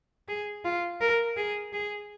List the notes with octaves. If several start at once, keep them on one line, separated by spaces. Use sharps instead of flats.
G#4
F4
A#4
G#4
G#4